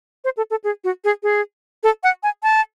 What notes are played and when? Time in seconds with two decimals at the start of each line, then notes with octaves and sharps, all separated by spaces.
0.24 C5
0.37 A4
0.51 A4
0.64 G#4
0.84 F#4
1.04 G#4
1.23 G#4
1.83 A4
2.03 F#5
2.23 G#5
2.43 A5